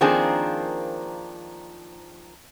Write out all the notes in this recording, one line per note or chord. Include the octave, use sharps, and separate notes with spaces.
D#3 F3 A#3 C4 D4 G#4